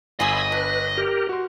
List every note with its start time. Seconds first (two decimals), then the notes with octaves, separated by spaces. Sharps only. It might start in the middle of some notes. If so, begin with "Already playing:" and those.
0.20 G1 F4 G#4 D#5 G#5 B5 E6
0.52 D4 B4
0.97 G4 A#4
1.29 F#4 C6